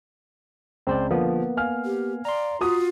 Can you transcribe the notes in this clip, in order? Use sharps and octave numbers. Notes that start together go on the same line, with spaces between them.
C#2 C4 C5 D5
D3 F3 A#3 B3
F5 G#5 F6
G4
D5 A#5 C6
F4 F#4 D#6